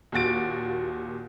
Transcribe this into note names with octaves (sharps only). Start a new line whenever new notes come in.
D#2 A#2 F#4 A6 D7